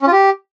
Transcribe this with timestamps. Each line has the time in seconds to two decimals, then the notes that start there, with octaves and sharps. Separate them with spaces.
0.02 C#4
0.07 F4
0.12 G4